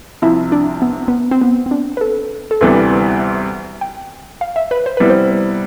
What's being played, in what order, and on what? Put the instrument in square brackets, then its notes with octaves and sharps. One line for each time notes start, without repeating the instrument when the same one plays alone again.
[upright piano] C2 C3 F3 [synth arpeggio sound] E4
[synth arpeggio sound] D4
B3
B3
C4
B3
C4
D4
B4
A4
A4
[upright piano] D2 C3 E3 G3 B3 [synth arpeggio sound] B4
[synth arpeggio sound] G5
F5
E5
B4
C5
[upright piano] C3 G3 B3 E4 [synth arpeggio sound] B4
[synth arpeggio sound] C5